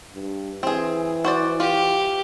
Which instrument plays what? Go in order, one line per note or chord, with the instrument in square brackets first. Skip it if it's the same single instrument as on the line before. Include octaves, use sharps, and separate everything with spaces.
[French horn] G2
[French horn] E3 [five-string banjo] C4 G#4
[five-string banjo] F#4 C5 D5
[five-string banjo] F4 [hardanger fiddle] G4